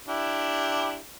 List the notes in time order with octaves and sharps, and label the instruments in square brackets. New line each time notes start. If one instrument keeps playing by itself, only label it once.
[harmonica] D4 E4 G4